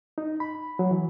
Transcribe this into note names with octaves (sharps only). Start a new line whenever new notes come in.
D#4
B5
F#3
E3